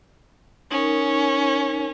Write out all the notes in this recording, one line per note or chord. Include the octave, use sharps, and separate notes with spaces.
C#4 D#4 A#4